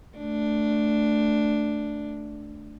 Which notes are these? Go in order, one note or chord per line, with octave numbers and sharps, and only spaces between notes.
A3 D4